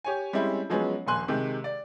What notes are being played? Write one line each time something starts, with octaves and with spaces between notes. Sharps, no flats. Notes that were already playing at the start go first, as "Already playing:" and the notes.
G4 C#5 G#5
G3 G#3 C4 C#4 E4
F3 F#3 G#3 B3 C#4
D#1 A#1 A#3 G#5 C6 F#6
C3 D#3 G#3 G4
D5